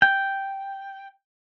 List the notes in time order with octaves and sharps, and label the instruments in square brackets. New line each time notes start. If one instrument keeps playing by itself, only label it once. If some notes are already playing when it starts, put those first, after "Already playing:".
[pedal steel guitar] G5